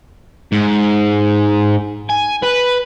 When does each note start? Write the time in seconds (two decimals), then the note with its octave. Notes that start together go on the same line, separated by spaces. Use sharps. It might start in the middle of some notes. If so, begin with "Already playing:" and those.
0.52 G#2
2.10 G#5
2.43 B4